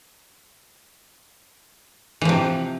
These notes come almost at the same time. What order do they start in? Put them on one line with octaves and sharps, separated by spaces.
E3 F3 C3